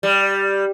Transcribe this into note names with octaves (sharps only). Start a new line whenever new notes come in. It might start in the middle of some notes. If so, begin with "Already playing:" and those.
G3